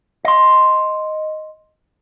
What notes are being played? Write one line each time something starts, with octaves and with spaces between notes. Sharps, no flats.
D#5 C6